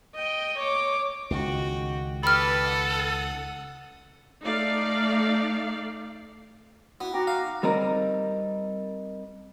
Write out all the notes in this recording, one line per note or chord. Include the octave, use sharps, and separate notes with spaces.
D#5 G5
C#5 D6
C#2 D#3 F#4 G5
G4 A4 B4 B5 F6
F#5 D#6
A3 D#4 D5 F5
B3 E4 F#4
D#4 F#4 G5 A#5 D6
F5
G3 C4 D#4 A#4